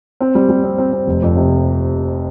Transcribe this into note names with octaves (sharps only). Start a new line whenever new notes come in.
C4
G3
G3
C4
C4
C4
F1
F2
C3